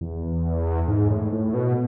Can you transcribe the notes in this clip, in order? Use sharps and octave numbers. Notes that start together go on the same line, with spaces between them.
E2
G#2
A2
A2
B2